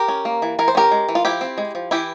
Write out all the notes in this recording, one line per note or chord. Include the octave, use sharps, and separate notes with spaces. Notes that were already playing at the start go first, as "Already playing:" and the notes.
Already playing: G4 A#4
C#4
A#3
E3
E3 A#4
C5
C#4 G4 A#4
G#3
E3
F4
F3 E4 G4
C4
G#3
F3
E3 E4 G4